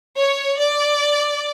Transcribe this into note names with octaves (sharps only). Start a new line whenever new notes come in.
C#5
D5